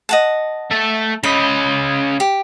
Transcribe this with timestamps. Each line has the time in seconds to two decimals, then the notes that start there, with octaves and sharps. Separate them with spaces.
0.09 D#5 F#5 A5
0.71 A3 E5
1.23 C#3 D#5 B5
2.20 G4